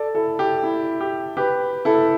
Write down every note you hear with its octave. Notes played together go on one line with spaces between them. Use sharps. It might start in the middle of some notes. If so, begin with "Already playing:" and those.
Already playing: A4 D5
E4 A4
G4
E4
G4
G4 B4
E4 A4